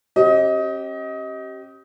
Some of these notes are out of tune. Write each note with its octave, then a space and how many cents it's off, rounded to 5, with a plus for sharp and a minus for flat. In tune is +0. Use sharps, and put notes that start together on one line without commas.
C#4 -40 G4 -20 D#5 +25